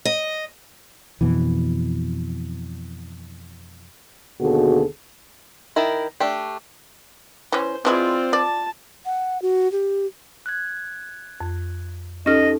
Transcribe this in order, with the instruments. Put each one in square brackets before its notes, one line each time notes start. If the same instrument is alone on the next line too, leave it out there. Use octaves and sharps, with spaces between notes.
[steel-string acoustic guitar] D#5
[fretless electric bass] F2 B2 E3
[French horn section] D#2 B2 D3 F#4 G#4 A4
[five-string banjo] D#3 E4 A#4
A3 D4 G4
[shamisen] E3 C#4 [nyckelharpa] C5
[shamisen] E3 G#3 E4 [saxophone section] C4 [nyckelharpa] F4 D5
[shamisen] D5 [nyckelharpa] A5
[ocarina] F#5
F#4
G4
[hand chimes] F#6 G#6
[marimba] F2
[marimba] C#4 F6 [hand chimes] D#4 G4 A4 [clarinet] D#5